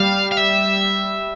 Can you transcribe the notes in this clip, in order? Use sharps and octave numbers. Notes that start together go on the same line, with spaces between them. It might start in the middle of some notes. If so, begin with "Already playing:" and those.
Already playing: G3 F5
F5
E5